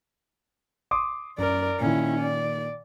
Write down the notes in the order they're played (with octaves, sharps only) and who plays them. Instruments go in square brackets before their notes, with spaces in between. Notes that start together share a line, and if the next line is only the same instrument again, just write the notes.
[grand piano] C6 D6 D#6
[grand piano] F#2 [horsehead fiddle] A#4 D5
[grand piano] A#2 D#3 [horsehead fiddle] C#4 E4
[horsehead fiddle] D5